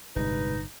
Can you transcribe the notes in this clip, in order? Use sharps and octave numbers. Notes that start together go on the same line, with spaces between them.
G1 A2 C3 G#3 D#4 B4